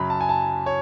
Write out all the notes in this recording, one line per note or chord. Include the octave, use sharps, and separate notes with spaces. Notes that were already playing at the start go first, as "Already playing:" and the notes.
Already playing: F#2 C#3 F#3 B5
A5
G#5
A5
C#5